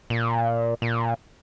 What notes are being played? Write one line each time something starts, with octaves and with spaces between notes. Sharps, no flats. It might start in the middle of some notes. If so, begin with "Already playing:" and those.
A#2
A#2